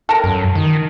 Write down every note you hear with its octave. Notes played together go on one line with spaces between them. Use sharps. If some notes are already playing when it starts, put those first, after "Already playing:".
A4 A#4
F#2
D#3